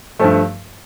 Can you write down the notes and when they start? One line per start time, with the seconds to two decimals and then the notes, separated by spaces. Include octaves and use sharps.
0.19 G2 F3 A3